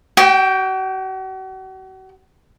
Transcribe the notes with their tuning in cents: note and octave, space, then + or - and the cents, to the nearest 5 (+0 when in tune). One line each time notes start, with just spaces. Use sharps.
F#4 +40 G5 +0